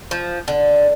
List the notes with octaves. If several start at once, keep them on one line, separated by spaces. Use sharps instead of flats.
F3
D3